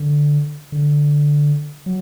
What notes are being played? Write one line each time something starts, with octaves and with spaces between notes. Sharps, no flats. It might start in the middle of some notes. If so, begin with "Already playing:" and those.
Already playing: D3
D3
F#3